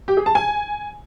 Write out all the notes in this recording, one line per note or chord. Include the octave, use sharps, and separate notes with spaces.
G4
G#4
A5
G#5